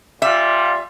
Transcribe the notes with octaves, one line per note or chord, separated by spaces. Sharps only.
A#2 G3 F4 E5